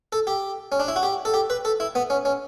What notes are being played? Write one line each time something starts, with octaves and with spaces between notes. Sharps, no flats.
A4
G4
C#4
D4
E4
F#4
G4
A4
G4
B4
A4
E4
B3
C#4
C#4